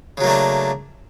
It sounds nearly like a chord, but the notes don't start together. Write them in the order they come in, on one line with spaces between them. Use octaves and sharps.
C#3 F#3 A#3 A3 D4